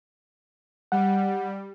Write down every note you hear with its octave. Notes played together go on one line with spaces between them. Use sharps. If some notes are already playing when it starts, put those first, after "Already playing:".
G3 F#5